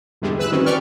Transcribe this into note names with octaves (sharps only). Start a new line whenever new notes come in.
E2 G#2 D3 E3 G3 G#3
B4 E6 F#6
D#3 F#3 G3 C4 C#4
B4 D5 G5 C#6 F6